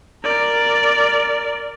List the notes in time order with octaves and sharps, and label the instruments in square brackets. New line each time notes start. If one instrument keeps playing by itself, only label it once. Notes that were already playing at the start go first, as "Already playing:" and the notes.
[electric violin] A#4 D5